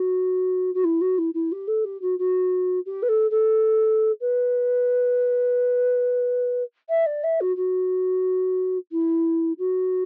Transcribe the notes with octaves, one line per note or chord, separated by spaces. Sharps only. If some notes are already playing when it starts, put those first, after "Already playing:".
Already playing: F#4
F#4
E4
F#4
E4
E4
G4
A4
G4
F#4
F#4
G4
B4
A4
A4
B4
E5
D5
E5
F#4
F#4
E4
F#4